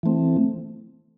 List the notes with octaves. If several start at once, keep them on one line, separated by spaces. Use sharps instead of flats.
E3 A3 C4